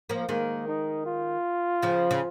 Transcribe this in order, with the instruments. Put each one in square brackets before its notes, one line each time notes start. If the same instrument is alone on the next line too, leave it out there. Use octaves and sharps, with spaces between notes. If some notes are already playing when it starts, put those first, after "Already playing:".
[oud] F3 A#3
[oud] D#3 G#3 [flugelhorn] A#3
[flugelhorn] D#4
F4
[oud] C#3 F3
C#3